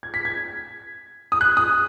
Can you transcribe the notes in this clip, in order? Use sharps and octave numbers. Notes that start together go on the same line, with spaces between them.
G#6
B6
G#6
D#6
F#6
D#6